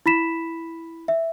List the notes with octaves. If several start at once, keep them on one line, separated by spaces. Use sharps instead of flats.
E4 B5 B6 E7
E5